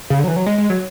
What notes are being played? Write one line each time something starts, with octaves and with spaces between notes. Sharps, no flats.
C#3
D3
F#3
E3
F#3
G#3
G#3
F#3